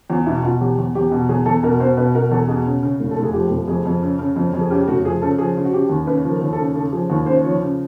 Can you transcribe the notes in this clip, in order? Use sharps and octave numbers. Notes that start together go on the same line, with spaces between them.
E2 F4
B2 E4
B2 F4
E2 G4
E2
E2 G4
B2
E2 G#4
E2 A4
B2 A#4
B2 C5
B2 B4
B2 A#4
E2 A4
B2 G#4
C#3
C#3
F1
A4
F1
G#4
F3 G4
F1
F2 G#4
F2
C#3
C#3
F2
F2
G#4
C#3 G4
F1 F#4
F3 G#4
C#3 A4
F3 G#4
C#3 F4
F#4
C#3 G4
D#2
C#3 B4
F3
A#4
D#2
A4
C#3
C#3 A4
F3 G#4
D#2
C#3 C5
F3 C#5
C#3